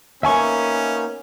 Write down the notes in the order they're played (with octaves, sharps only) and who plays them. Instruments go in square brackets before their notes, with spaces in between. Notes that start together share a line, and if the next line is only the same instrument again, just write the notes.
[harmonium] A#3 B3 D#4 [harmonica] C#4 [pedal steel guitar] E5 G#5 C#6